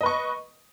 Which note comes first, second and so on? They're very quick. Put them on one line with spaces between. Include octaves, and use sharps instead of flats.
D#5 B4 C#6